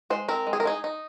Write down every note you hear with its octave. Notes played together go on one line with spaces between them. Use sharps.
G#3 C5
C4 A#4
G#3
G#4
A#4
D#4 G#4
D#4